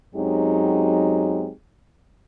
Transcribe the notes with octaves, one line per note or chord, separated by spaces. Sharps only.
F#2 F#3 G#3 C4 D#4 G4